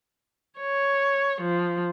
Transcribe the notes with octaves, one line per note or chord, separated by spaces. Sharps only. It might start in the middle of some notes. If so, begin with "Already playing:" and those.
C#5
F3